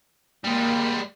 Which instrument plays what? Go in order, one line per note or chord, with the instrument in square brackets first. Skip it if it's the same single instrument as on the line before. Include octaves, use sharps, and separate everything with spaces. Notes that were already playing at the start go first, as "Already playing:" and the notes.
[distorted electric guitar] G3 G#3 [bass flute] A#3